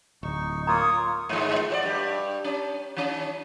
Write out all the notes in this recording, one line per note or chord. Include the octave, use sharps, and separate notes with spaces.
D1 D#4 C#6
A#3 F4 C#5 A#5 D#6
G#2 D#3 G#3
F#4 C5 D5
G2 G4
C#4
D#3 C#4